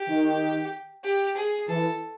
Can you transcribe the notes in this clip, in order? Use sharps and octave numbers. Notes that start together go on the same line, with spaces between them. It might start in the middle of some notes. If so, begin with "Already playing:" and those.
Already playing: G4
D#3
G4
G#4
E3 A4